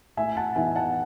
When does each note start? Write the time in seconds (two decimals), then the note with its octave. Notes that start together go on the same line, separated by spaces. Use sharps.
0.17 A2 E5 G#5
0.37 F#5 A5
0.56 E3 B3 D#4 E5 G#5
0.76 F#5 A5